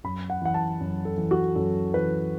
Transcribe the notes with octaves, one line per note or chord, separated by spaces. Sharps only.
F#2 B5
F#5
E3 F#5
A5
F#2
A4
E3
F#4
F#2 A4
E3 B4